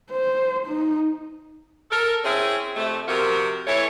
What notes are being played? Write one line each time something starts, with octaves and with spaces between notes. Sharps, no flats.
C5
D#4
A4 A#4
C4 C#4 E4 G#4
F2 C3 A3
C3 F3 F#4 A#4
E3 A3 E4 C#5